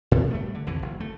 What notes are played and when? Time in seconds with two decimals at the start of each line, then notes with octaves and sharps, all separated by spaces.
0.11 A2 C3
0.31 G3 A3 B3
0.55 D3
0.66 C2 F2 D3 E3
0.82 F#1
1.00 A3